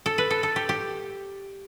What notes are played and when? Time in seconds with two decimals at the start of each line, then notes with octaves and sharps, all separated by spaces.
0.06 A4
0.18 B4
0.31 A4
0.43 A4
0.56 G4
0.69 G4